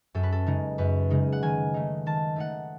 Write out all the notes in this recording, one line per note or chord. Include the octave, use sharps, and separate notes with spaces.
F#2 A4
B4
A4
C#3 G#3 D#4
F#2 B4
C#3 G#3 D#4
F#5
D#3 G#5
A3 D#4
D#3 A5
A3 D#4 F#5